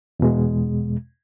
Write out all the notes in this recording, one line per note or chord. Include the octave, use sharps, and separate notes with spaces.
E2 B2 G#3